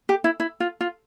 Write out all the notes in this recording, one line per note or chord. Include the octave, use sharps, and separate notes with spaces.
G4
E4
E4
F4
F4